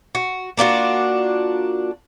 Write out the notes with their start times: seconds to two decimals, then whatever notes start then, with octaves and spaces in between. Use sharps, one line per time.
0.15 F#4
0.57 A#3 D4 F4 F#4